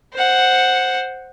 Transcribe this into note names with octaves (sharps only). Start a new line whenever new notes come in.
C5 F#5